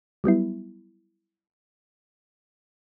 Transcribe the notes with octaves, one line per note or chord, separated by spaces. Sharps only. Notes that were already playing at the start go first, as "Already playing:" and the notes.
F#3 G3 B3 E4